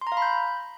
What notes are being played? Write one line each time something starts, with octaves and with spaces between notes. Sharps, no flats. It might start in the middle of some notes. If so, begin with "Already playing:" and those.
C6
A#5
F5
B5
G6